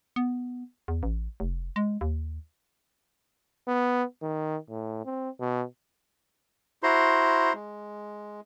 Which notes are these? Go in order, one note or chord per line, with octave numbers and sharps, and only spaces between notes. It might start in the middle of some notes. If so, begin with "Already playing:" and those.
B3
E2
A1
F1
G#3
D#2
B3
D#3
A2
C4
B2
E4 F#4 C5 A#5 C6
G#3